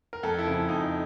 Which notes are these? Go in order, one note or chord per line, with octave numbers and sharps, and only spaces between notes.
A#4
F2 A4
E4
C#3 F3
E4
F2 D#4